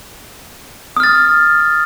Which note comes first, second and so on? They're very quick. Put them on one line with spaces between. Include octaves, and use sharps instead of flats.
D#6 F6 A6